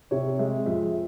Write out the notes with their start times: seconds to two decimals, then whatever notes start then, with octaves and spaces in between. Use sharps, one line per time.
0.11 C3 C#5
0.39 G#3 E5
0.66 F2 E5